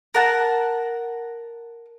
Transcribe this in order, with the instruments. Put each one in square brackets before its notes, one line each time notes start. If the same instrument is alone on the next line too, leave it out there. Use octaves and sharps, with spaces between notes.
[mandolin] A#4 F#5 A5